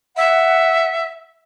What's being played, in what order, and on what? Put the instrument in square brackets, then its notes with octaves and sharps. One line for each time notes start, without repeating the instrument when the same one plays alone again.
[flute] E5 [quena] F#5